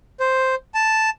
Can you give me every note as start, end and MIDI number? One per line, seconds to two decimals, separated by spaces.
0.20 0.55 72
0.74 1.10 81